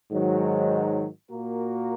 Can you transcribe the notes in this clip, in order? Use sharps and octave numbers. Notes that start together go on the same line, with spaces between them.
G#2 D#3 F#3
A#2 A#3 F#4 A#4